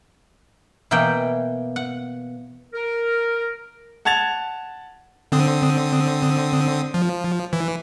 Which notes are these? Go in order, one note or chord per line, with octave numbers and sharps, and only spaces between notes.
B2 E3 A#3 F#5 G5
F#5
A#4
F#5 A5 G#6 A6 F7
D3 C4 D#6
F3
E3